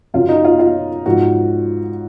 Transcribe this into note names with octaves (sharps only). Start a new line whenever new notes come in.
F#2 C#3 F#3 F4
D#4
F4
F4
G#2 F3 F#4